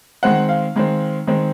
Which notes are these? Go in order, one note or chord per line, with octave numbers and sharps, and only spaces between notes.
D#3 G#3 C4 F#5
F5
D#3 G#3 C4
D#3 G#3 C4